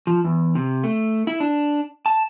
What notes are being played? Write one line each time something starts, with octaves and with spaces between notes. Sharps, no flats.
F3
E2
C3
A3
E4
D4
A5